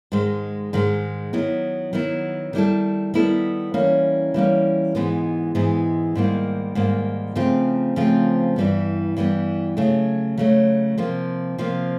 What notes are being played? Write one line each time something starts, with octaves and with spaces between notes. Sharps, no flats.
G#2 D#3 G#3
G#2 D#3 G#3
D#3 F#3 B3 E4
D#3 F#3 B3 E4
D#3 G3 B3 E4 A4
D#3 G3 B3 E4 A4
E3 G3 A#3 C#4
E3 G3 A#3 C#4
G#2 E3 G#3 B3
G#2 E3 G#3 B3
G#2 D#3 G3 A#3
G#2 D#3 G3 A#3
C#3 F3 A3 C4 F4
C#3 F3 A3 C4 F4
G2 E3 G3 B3
G2 E3 G3 B3
C#3 F#3 A3
C#3 F#3 A3
C3 F3 A#3
C3 F3 A#3